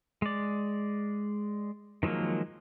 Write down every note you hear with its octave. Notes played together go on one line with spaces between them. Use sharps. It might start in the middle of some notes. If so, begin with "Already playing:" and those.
G#3 D5
D#3 F3 F#3 G#3 A#3